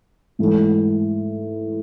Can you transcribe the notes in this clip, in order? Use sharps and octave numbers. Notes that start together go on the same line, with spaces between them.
G#2 E3 A3